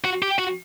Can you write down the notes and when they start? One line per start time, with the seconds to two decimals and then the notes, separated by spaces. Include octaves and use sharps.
0.04 F#4
0.23 G4
0.39 F#4